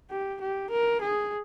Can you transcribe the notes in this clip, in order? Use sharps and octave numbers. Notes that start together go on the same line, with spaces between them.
G4
G4
A#4
G#4